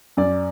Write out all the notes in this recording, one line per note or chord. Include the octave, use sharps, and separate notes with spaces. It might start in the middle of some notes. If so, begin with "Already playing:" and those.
F#2 D5